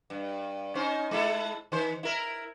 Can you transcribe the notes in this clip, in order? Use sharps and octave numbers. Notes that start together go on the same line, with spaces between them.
G2
C#4 D#4 C5
G#3 E4 A4
D#3 C5
E4 A#4